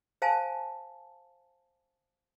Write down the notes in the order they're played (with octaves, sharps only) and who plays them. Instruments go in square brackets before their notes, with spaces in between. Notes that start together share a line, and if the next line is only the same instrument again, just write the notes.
[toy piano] C5 F5 G#5 A5